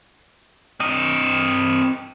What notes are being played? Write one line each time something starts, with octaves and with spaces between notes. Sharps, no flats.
C4 D#5